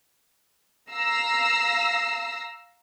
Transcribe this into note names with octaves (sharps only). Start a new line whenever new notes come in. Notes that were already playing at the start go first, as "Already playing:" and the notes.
F5 A#5 E6 A#6 C7